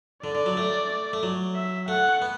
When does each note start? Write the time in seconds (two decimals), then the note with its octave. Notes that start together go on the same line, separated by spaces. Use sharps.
0.24 D3 D5
0.35 D3
0.46 F#3
0.57 A3
1.13 A3
1.23 F#3
1.56 E5
1.88 A3 F#5
2.22 B3